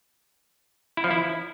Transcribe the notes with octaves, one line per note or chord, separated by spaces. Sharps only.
E4
F3
E4